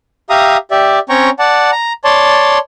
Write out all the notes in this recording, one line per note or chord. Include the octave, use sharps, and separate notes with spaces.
G4 E5 F5 A#5 D#6
G4 D5 E5
C4 C#4 C#5 G5 A#5 C#6
D5 F#5 A5
A#5
C#5 D5 A5 C6